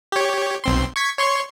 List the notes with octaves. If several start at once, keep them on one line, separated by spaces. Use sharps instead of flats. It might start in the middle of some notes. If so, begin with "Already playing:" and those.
G4 C#5
B1 C4 C6
C#6 G#6 B6
C#5 C6 C#6